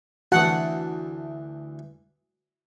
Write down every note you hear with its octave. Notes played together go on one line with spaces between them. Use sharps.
D2 E3 F#4 F#5 A5